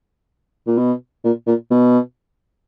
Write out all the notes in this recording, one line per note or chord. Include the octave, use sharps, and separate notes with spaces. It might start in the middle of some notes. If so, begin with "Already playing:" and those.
A#2
B2
A#2
A#2
B2